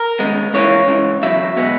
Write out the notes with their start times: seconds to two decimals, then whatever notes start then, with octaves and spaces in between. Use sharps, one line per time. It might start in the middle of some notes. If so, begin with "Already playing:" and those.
Already playing: A#4
0.19 D#2 C#3 G#3 B3
0.54 C#2 C#3 E3 A#3 C#5
0.88 C#2 C#3 E3
1.22 E2 C#3 F#3 E5
1.56 B2 G#3 B3